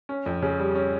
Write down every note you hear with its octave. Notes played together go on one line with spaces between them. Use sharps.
C#4
F2
C#3
G3
C#4